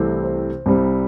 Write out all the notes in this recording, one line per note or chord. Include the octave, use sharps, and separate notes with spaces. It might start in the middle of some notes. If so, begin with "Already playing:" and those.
Already playing: C2 C3 E3 A3 C4
C5
C2 C3 G3 C4